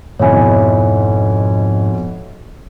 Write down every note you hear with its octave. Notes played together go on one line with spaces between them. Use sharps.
F2 G#2 B2 E4 C#5 G#5